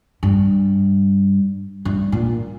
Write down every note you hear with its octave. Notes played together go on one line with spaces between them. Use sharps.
G2
G2
A#2